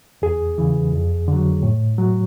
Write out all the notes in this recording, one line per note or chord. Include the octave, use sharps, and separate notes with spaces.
E2 G#4
C#3 E3
F2
D3 F#3
A2
F#3